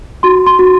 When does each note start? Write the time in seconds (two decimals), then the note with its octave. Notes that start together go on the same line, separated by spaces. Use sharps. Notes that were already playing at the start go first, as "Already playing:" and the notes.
0.23 F#4 C6
0.47 C6
0.59 F#4